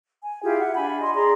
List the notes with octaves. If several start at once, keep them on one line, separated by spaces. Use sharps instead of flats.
G#5
E4 F4 G4 G#4
E5 F#5
D4 G#5 B5
D#5 C6
G#4 D5 A#5 C6